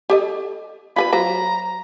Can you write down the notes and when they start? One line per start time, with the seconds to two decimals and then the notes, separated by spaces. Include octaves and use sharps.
0.10 G4 A4 D#5
0.96 F4 A4 B4 B5
1.13 F#3 F4 C5 A#5